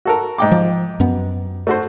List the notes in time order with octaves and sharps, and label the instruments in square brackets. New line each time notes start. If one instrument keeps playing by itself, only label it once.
[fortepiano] F#4 A4 A#4
G#2 G5 D6
[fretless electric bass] F3
F#2 B3
[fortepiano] A3 F#4 C5